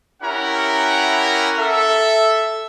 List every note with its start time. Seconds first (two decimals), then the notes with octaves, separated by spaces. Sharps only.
0.22 C#4 E4 G4 A#4 F#5 A#5
1.58 A4 E5